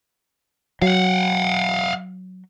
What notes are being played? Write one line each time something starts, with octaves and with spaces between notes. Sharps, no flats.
F#3 F5 F#5